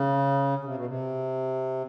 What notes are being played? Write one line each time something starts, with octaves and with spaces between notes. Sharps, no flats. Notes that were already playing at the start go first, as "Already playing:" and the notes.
Already playing: C#3
C#3
C3
B2
C3